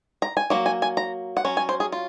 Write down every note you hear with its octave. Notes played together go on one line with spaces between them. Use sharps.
A#5
G#5
F#3 A#3
G#5
G#5
A#5
F#5
F#3 C#4
G#5
C5
G#4
F4